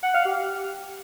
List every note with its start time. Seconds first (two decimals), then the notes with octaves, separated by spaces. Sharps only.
0.03 F#5
0.14 F5
0.25 G4